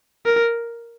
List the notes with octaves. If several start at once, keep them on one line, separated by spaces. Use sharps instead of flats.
A#4